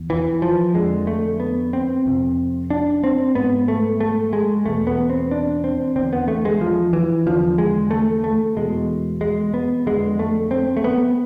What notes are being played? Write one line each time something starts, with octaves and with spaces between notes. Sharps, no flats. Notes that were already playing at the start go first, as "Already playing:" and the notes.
Already playing: E2
E3
F3
F2 D3 G#3
A3
B3
C4
F2 C3
D4
C4
G#2 B3
A3
A3
G#3
E2 B2 A3
B3
C4
D4
C4
E2 D3 C4
B3
A3
G#3
F3
E3
E2 D3 F3
G#3
A3
A3
E2 B2 G#3
G#3
B3
F2 D3 G#3
A3
C4
A3
B3